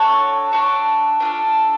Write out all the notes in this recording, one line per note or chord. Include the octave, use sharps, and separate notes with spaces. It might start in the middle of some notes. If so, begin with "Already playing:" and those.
Already playing: D4 F#4 A4 C#5
D4 F#4 A4
D4 F4 A4